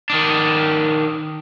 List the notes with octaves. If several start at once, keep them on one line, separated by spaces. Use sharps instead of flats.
D#3 D4